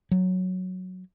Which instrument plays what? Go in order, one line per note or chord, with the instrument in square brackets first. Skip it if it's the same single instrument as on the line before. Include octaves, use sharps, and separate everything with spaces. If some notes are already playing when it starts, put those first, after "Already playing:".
[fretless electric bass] F#3